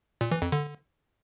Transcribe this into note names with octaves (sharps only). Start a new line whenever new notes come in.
A#2
E3
F2
D3